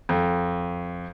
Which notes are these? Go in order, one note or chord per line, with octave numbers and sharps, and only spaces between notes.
F2